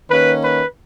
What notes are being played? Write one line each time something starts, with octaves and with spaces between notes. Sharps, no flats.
D#3 A#3 C#4 B4
B4